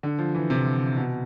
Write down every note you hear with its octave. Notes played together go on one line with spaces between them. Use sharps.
D3
F3
E3
C3
B2